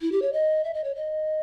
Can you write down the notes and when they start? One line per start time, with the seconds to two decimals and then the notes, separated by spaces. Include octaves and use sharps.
0.01 E4
0.12 G4
0.22 C#5
0.33 D#5
0.64 E5
0.74 D#5
0.84 C#5
0.95 D#5